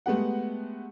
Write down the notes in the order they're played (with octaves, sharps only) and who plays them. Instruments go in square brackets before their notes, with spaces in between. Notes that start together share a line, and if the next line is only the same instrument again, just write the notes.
[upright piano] G#3 A3 B3 G4 F#5